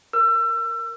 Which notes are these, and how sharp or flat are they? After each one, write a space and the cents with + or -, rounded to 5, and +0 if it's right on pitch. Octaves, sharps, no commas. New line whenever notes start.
A#4 +0 E6 +35